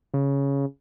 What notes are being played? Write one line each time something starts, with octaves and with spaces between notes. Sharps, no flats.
C#3